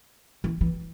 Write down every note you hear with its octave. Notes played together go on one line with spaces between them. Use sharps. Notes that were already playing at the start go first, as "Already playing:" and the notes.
E3
E3